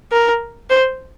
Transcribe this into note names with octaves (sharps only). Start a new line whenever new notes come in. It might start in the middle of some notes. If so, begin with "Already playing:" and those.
A#4
C5